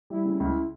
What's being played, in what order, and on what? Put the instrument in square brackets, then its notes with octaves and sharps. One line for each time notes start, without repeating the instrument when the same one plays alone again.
[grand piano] G3 [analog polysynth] E4
[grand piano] C#3
C#2